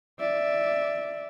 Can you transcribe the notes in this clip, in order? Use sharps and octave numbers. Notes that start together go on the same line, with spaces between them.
D5 E5